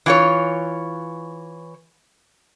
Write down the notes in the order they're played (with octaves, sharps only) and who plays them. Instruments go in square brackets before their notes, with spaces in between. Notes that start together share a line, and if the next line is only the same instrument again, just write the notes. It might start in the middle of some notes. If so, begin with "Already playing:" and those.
[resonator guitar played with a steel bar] E3 F4 C#5